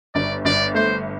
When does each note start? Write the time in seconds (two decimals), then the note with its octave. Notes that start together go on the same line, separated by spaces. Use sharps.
0.15 G1 D5
0.45 G1 D5
0.75 A3 C5